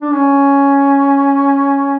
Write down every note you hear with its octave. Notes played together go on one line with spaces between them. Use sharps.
D4
C#4